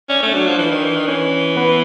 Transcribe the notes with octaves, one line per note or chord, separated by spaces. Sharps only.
C#4 D5
A3 C#5
F#3 D4 D5
F3
E3
D#3
E3
D#3
E3 C#4 C#5
B3 B4